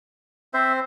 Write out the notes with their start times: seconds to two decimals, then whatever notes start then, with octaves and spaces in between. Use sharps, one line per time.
0.54 C4 C5 E5